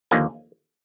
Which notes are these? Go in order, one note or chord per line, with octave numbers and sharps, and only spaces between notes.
D#2 D3 F3 A#3 G#5